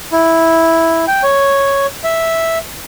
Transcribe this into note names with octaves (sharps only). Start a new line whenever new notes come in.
E4
G5
C#5
E5